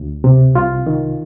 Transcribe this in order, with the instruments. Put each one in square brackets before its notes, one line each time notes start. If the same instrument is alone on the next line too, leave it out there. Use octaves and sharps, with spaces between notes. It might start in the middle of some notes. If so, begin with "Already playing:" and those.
Already playing: [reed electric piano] D2
C3
C2 F4
D#3